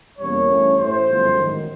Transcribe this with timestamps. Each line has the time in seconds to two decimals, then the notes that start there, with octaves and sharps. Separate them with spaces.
0.18 E2 B2 G3 A#3 C#4 C#5
0.49 G2 E3 A3 C#4
0.78 A1 A2 E3 A3 C5
1.08 G1 F#2 C#3 F3 A3
1.38 A1 G#2 D#3 F#3